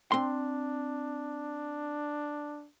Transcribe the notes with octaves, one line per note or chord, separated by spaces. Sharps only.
C4 D4 C6